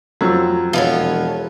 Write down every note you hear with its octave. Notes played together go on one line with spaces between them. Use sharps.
F2 F#3
E1 F3 B3 C#5